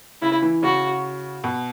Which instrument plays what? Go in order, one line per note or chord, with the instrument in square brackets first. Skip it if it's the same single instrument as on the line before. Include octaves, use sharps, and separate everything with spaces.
[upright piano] C#3 [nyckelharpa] E4
[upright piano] E3
[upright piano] C#3 [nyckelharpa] F#4
[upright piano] B2